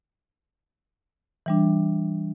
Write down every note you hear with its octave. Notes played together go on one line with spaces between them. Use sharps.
E3 G3 D4